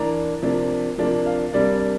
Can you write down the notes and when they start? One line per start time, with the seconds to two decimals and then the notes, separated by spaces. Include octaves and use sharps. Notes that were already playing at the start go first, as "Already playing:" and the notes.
Already playing: E3 A#3 D4 A#5
0.42 C3 F3 A#3 D4
0.98 C3 F3 A#3 D4
1.26 F5
1.53 C3 G3 A#3 D4 D5
1.73 D5